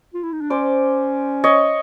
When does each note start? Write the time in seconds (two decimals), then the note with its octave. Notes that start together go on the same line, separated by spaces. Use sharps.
0.14 F4
0.23 E4
0.32 D#4
0.41 D4
0.50 C#4 C5 D5
1.44 C#5 D#5